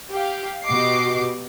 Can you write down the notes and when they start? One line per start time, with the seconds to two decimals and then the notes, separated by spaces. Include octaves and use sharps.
0.11 G4 F5
0.65 B2 F#4 G4 D#5 D6 C7